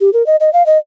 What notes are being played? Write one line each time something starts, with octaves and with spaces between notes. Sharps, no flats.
G4
A#4
D#5
D#5
F5
D#5